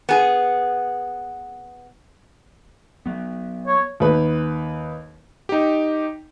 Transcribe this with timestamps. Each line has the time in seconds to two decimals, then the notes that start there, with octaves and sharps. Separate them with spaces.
0.09 B3 G#4
3.06 F#3 B3
3.67 C#5
4.00 D#2 B4
5.49 D#4 G4